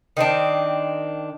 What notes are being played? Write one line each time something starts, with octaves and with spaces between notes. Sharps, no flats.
D#3 C4 D4